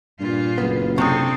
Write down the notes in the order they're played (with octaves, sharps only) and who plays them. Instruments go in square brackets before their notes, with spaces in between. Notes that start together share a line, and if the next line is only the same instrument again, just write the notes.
[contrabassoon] G2 [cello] A#2 F4
[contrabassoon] F#1 [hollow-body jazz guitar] B3
[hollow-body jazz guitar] C3 D4 [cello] C4 A4 [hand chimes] C#6 D#6